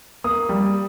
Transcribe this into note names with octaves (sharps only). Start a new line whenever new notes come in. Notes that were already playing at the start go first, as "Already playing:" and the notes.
A#3 D#6
G3